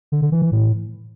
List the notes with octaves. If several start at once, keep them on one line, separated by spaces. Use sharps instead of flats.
D3
D3
E3
E3
A2